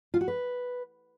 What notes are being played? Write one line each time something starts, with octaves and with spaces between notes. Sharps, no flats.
F4
F#4
B4